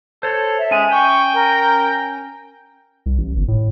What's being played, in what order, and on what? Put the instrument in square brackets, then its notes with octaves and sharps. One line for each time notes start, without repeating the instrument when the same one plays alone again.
[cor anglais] A4 [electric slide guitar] C5 C#5
[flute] E5
[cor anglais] G#3 [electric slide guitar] C#4 G#5
[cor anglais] G5 [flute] C#6
[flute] A#4
[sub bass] C2
A1
G1
A2